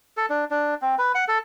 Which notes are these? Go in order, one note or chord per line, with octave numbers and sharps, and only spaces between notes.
A4
D4
D4
C4
B4
F#5
A4